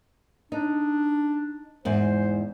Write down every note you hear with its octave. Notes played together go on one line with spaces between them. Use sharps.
D4 D#4
E2 G#2 C5